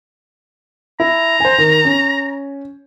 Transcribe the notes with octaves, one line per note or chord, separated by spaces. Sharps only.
E4 A#5
C5 G#5
D#3
C#4